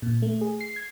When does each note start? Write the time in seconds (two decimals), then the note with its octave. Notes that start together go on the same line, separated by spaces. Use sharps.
0.02 A#2
0.22 A3
0.41 G#4
0.61 C7
0.76 G#6